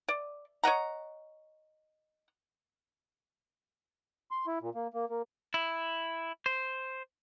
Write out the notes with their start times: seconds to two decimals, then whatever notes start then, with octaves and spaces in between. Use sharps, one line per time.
0.09 D5
0.64 C#5 D#5 F#5 A#5
4.31 C6
4.47 E4
4.61 A#2
4.75 A#3
4.94 A#3
5.10 A#3
5.54 E4
6.46 C5